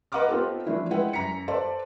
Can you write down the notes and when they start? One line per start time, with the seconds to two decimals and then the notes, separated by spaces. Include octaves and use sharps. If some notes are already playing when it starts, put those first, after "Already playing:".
0.12 B4 D#5 F#5 A#5 D6 F6
0.29 B3 C4 D#4 F4 G4 A4
0.67 E3 F3 A3 D4 E4
0.91 G#3 E4 B4 E5 F#5 G5
1.13 F#2 A#5 B6 C#7
1.48 A4 B4 C5 D5 A5